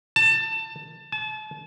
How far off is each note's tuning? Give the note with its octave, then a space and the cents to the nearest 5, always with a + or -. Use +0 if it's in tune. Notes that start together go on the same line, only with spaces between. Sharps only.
A5 +20
A5 -35